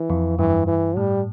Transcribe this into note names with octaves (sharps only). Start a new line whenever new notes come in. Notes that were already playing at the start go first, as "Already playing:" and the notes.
Already playing: E3
F2
G2 E3
E3
A2 G3